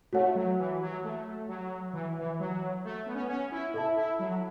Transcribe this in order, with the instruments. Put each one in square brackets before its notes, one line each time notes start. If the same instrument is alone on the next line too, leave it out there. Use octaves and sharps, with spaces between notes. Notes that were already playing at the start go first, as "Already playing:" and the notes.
[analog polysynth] A3 [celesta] F#4 C#5 F#5
[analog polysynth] F#3
E3
F#3
A3
F#3
E3
E3
F#3
A3
B3
C#4
B3
C#4
E4
[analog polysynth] E4 [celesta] A4 E5 A5
[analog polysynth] E4
F#3